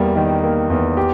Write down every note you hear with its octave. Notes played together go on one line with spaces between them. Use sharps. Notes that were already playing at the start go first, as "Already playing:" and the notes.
Already playing: E2 G3 A#3
D#3
A#3
E2
G4